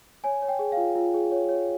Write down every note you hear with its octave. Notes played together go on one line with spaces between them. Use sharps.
C#5 G#5
C#5
G5
G#4
F4 F5
F4
G#4
C#5
C#5